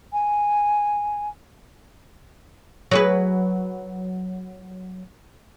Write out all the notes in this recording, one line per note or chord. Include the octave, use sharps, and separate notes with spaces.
G#5
F#3 G#4 B4